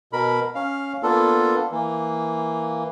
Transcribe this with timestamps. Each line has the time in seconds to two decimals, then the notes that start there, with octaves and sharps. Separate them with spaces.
0.13 B2 A#4 B5
0.55 C#4 F5
1.03 A#3 B3 D4 F4 A4
1.71 E3 A#3